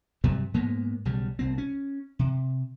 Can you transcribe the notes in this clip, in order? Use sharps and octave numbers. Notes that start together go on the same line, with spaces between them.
G2 C3 F#3 G3
G#2 G#3 A#3 B3
B1 C#3 G3
C2 C4
C#4
C3